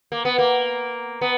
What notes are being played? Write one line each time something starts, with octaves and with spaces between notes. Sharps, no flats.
A#3
B3
A#3
B3